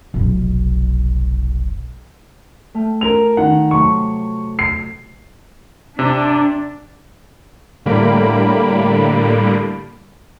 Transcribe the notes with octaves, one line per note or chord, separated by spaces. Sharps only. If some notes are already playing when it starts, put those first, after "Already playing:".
F1 B1
A3 G5 F6
F4 A#4 F7
D#3 F#5
C3 F#3 A3 C#6
C7
C3 D4
A2 D3 G3 A#3 B5 D7